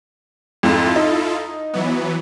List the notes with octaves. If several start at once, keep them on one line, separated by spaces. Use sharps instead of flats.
F2 G#2 E4 F4 A4
D#4
E3 F#3 B3